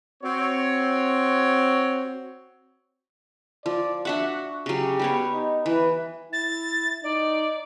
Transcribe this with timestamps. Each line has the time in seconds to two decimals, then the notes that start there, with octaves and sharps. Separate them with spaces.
0.23 C4 F#4 C#5
3.66 F3 D5
4.05 D4 F#4 E5 F#5
4.66 C#3 F#3 G4
4.99 G3 B3 C#5
5.32 D#4
5.66 E3 B4
6.32 E4 A6
7.03 D#4 D5